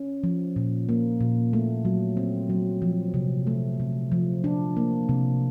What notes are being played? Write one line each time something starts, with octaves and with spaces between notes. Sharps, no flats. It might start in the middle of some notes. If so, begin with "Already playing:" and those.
Already playing: C#4
F3
A#2
A#3
A#2
A3
F#3
C4
F#3
F3
C3
A3
C3
F3
D4
A#3
C3